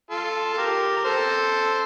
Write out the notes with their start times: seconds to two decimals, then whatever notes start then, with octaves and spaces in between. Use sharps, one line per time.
0.10 F4 A4
0.53 A4
0.57 G4 A#4
0.97 A#4
1.04 A4 C5